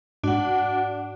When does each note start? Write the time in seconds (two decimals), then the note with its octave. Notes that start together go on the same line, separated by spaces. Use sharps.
0.24 G#2 D4 F#4 F#5